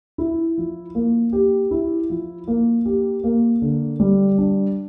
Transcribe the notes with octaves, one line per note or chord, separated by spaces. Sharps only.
E4
F3
A#3
G4
E4
F3
A#3
G4
A#3
D3
G3
D4